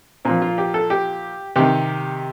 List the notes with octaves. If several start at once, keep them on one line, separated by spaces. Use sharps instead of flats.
A#2 F3 C4
F4
G4
A4
G4
C3 D#3 G4